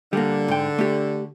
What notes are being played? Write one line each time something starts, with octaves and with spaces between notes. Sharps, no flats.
D3 G3 A#3
G#2 G5
A3 G4